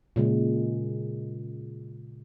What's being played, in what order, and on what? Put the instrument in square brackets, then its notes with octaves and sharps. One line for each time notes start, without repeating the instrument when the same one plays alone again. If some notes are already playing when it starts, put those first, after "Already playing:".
[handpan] A#2 C#3 G#3